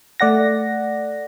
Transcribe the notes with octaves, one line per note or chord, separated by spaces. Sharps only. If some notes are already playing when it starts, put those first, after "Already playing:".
A3 D5 F#5 A#6